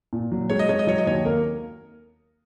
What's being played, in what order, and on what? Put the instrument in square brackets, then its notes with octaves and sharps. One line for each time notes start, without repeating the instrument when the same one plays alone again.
[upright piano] A#2
F#3
[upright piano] G#3 [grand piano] C#5
[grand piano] D#5
[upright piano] G#3 [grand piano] C#5
[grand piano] D#5
[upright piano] F#3 [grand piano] C#5
[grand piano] D#5
[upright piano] D#2 [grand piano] C#5
[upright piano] A#3 [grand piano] A#4